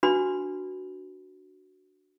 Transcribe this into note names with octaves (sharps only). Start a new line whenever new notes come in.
D4 F#4 B4 B5